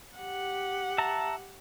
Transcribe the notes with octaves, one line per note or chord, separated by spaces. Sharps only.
G4 F#5
E5 A5 A#5